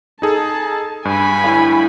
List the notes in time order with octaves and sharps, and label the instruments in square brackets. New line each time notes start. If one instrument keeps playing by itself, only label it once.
[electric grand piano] D#4 G#4 A4 [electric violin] A5
[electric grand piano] G2 [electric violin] G#5 B5
[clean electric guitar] E4 A4 F5